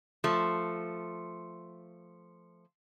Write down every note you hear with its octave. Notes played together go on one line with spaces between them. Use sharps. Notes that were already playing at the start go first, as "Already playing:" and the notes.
F3 A3